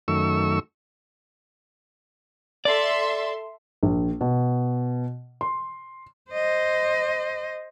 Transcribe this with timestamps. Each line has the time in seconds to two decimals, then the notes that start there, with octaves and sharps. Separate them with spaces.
0.08 F#2 D#3 A3 C#6 E6
2.65 A4 D5 E5 C6
3.83 A#1
4.21 B2
5.41 C6
6.32 C5 D#5